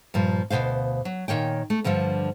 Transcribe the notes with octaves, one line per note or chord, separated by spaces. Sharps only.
G2 A#2 F3 G3
D2 G#2 B2 C5 F5
F#3
A#2 D#3 C#5 G5
A3
G2 D3 F3 G3